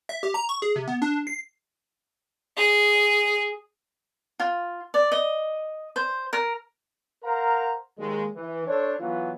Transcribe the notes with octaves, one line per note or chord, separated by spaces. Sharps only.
E5
G4
A#5
C#6
G#4
C3
B3
D4
C7
G#4
F4
D5
D#5
C5
A#4
A#4 C5 F5 F#5 A#5
D#2 G#3
E3
D4 A4 C5 C#5
E3 F#3 B3 F4